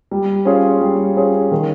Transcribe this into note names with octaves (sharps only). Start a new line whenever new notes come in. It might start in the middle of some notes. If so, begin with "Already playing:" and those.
G3
C#4 F4 G#4 C#5
G3
C#4 F4 G#4 C#5
D#3